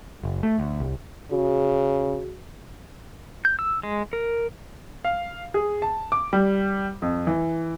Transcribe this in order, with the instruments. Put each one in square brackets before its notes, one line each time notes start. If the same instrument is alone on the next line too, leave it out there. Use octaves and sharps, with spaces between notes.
[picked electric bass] F#1
A3
D2
C2
[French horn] C#3 [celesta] F#4 G#4
[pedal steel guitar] G6
E6
G#3
A#4
[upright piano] F5
G#4
A5
D6
G3
F2
E3